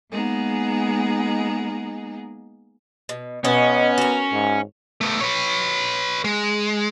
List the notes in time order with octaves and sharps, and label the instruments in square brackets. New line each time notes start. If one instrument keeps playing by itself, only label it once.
[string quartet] G#3 A#3 B3 D#4 G#4
[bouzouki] B2
[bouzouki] B2 D#5 [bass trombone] B3 [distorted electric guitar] C#4
[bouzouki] F#4 A#4
[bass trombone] G#2
[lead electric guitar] A3 B3
B4 C#5
G#3